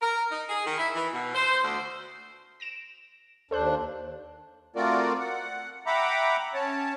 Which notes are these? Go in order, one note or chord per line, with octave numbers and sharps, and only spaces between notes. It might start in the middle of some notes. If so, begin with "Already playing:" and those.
A#4
D#4
G#4
D#3
E4
E3
B2
C5
D2
A#6 D7 E7
D#2 D4 A4 C5 F#6
A3 C4 F4 F#4 A#4 D5
F#5
E5 F#5 G5 A#5 B5 D6
C#4 C#5 A5